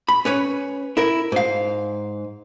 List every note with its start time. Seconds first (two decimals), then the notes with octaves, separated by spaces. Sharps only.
0.08 B5
0.25 C#4 B4 C#5
0.97 E4 A#4
1.32 G#2 F5